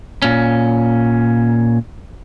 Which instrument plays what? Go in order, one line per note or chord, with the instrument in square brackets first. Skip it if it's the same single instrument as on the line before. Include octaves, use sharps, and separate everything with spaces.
[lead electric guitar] A#2 C#4